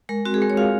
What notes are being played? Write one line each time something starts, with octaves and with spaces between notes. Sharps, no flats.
G#3 A#4
C4 F#4
G#4
G#3 A#4
C#5
F4 F5